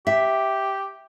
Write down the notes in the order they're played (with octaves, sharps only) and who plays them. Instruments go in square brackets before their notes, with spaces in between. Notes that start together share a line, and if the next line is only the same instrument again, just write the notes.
[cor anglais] G4 [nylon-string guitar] E5